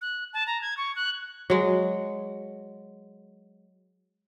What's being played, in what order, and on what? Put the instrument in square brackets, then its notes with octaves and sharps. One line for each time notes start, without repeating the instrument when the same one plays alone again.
[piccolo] F#6
A5
A#5
G#6
C#6
F#6
[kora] F#3 G#3